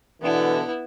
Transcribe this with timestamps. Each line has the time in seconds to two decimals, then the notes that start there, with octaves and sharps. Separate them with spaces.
0.22 B2 D3 E3 B3 E4